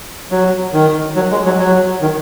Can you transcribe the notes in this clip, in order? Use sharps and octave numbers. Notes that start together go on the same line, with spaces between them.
F#3
D#3
F#3
G#3
F#3
F#3
D#3